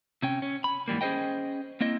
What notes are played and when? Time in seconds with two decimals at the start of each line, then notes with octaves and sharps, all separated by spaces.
0.22 C3 C#4 G5
0.42 C#4
0.64 B5
0.88 G#2 E3 G3 A#3
1.01 C#4 G#4 A4 C5 D#5 G5
1.81 A#3 C4 E4 D#5